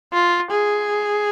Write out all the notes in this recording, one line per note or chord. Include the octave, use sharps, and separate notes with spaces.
F4
G#4